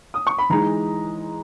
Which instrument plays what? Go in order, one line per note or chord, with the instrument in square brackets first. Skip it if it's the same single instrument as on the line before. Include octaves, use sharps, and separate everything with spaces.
[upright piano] D#6
C#6
B5
E3 G#3 D#4 A#5